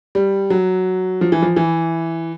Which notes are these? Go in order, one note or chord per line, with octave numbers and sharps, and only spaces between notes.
G3
F#3
F3
E3
F3
E3